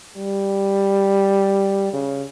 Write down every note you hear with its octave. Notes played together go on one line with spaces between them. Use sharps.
G3
C#3